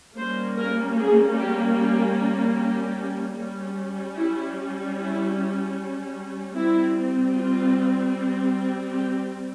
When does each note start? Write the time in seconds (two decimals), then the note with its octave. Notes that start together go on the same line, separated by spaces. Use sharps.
0.18 G3 A#3 C#4 C5
0.58 A#4
0.98 G#4
1.39 G4
1.78 G4
2.57 G4
3.38 G3 C#4
4.17 E4
4.97 E4
6.55 G3 C4 E4
7.36 F4
8.95 G4